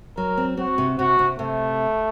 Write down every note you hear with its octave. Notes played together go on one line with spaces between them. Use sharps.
F#3 A#4
C4
C4 F#4
C3
C3 F#4
C3
C3 A3